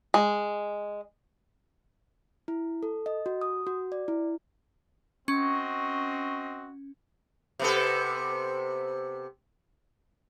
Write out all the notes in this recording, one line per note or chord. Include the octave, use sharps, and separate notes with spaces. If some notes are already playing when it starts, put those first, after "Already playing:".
G#3
E4
A4
D#5
F#4
D#6
F#4
D5
E4
C4 C#4 F#4 D#5 C#6
C3 B3 A4